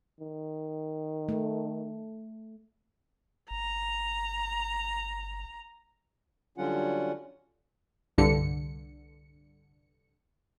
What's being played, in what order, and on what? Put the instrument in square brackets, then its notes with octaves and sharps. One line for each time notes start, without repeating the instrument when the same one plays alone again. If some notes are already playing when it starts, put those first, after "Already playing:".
[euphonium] D#3
[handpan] A3
[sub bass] G1 [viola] A#5
[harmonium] D3 F#3 G3 C#4 F4 F#5
[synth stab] C2 G2 D3 C#7